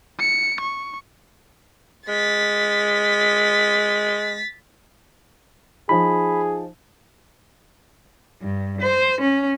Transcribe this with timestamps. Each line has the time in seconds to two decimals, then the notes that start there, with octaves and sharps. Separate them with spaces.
0.20 C#7
0.61 C#6
2.08 G#3 A6 B6
5.89 F3 D#4 G#4 B5
8.42 G2
8.81 C5
9.21 C#4